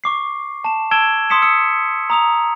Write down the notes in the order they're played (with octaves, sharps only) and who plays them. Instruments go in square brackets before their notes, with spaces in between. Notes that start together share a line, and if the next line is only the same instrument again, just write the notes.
[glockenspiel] C#6 D6 C7
A5 E7
A5 E6 G#6 D7 E7 G7
C6 D#6 B6 C#7 E7
E6 C#7
A#5 D#6 F7